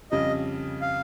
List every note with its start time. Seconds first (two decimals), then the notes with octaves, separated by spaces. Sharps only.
0.11 F2 C#3 G3 D#5
0.81 F5